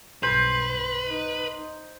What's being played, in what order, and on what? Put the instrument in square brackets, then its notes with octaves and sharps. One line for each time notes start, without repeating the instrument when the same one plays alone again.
[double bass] B1 G2 [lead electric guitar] B4 [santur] C5
[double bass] D#4